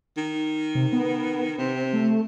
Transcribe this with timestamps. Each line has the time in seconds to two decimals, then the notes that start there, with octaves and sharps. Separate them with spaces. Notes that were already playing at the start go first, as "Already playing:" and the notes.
0.17 D#3
0.75 C3
0.93 B3
1.58 C3 C4
1.93 A3